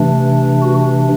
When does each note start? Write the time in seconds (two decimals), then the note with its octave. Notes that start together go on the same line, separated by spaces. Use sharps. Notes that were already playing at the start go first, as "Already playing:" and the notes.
Already playing: C3 E3 A3 D4
0.62 F#4